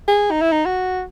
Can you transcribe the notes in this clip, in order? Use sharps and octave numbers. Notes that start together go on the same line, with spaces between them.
G#4
D#4
E4
D#4
F#4